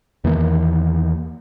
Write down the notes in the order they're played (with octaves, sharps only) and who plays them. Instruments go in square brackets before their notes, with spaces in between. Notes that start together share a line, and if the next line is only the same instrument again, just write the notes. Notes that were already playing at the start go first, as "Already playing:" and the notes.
[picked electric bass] E2 D#3 E3 A#3